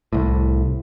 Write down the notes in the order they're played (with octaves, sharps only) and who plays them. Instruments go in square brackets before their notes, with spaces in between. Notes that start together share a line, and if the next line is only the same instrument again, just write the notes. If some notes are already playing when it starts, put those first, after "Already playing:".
[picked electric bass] C2 A2